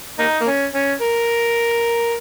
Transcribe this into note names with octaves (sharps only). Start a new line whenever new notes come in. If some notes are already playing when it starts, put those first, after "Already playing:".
A#3 D#4
A#3
C#4
C#4
A#4